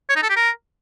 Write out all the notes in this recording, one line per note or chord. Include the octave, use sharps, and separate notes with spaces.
C#5
D#4
A4
G4
A#4